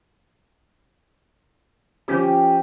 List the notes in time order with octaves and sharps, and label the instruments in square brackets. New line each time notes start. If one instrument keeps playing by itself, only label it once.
[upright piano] F3 C#4 [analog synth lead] G4